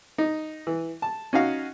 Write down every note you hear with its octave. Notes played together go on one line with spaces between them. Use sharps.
D#4
E3
A5
C#4 D#4 F#4 F5